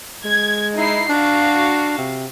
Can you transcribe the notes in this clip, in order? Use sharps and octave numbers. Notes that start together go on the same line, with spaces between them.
G#3 G#6
D#4 E4 C7
D4 F#4 F5
C3